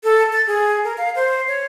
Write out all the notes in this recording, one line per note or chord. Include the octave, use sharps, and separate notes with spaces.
A4
A6
G#4
A#4
F5
C5
C#5